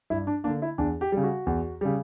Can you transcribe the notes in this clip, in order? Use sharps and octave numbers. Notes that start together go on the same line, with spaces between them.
G2 E4
D4
D3 A#3 D4
E4
E2 D4
G4
C#3 G3
F#4
E2
C#3 G3